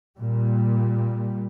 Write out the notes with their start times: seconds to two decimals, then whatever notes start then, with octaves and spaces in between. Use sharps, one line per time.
0.18 A#2 G3